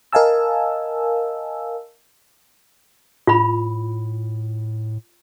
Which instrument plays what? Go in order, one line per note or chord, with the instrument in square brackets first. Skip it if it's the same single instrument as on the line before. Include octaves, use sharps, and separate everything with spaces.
[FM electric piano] A#4 D#5 F5 G#5 A5 E6
[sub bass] A2 [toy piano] F4 B5